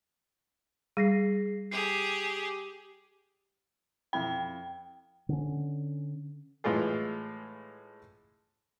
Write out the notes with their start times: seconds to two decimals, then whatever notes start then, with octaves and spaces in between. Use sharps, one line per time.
0.97 G3 G#4 A#6 C7
1.71 G4 G#4 C7
4.13 F2 E4 G5 B5
5.29 D3 C#4
6.64 A2 E3 G#3 F4 G#4